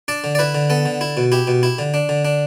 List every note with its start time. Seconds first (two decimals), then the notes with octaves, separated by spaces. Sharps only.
0.08 D4 D5
0.24 D3
0.35 D5
0.39 E4 B4
0.55 D3
0.70 B3 A4
0.86 D3
1.01 E4
1.17 B2
1.32 E4 G4
1.48 B2
1.63 E4
1.79 D3
1.94 D4
2.09 D3
2.25 D4